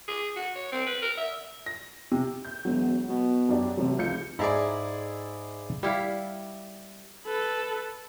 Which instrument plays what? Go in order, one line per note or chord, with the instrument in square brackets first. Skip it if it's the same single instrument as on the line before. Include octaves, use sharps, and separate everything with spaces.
[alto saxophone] G#4
F#4
C#5
C4
B4
A#4
E5
[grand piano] A#6
C3
[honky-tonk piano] G6
[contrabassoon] E1 [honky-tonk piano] F#3
[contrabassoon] B2
[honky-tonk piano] F#2 D4 G4
[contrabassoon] A1 [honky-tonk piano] C3 F#3
[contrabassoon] F1 [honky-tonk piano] C#2 G6 C#7
[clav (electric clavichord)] G#2 A4 A#5 [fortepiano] E4 G#4 D5
[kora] G3 E4 F5
[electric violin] A4 B4